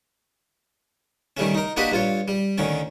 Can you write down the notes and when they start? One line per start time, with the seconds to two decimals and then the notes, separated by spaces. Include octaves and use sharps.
1.37 D#3 G3 A3 C#4
1.55 D#4 A#4
1.77 A#3 D4 F#4 G4 B4 D#5
1.92 G2 F4 C#5
2.28 G3
2.58 D2 D3 D#3 C#4